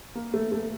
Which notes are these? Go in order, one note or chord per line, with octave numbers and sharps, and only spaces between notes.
A#3
A3
A3